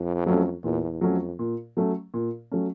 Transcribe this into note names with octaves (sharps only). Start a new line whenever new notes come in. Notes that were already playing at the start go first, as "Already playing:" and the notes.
Already playing: F2
F#3 A3 C#4
E2 A#2
F2 F#3 A3 C#4
A#2
F#3 A3 C#4
A#2
F#3 A3 C#4